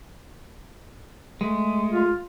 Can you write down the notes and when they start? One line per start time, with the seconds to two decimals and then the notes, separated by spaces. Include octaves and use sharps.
1.41 G#3 A3
1.92 F4